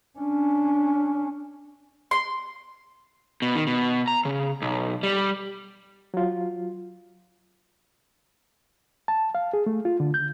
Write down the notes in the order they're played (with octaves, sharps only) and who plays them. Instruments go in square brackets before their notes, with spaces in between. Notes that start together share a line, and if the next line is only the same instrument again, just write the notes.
[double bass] C#4 D4
[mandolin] C6
[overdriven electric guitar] B2
D#3
B2
A#5
C#3
B1
G3
[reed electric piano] F#3 F4
A5
F5
G#4
A3
F4
D3
G6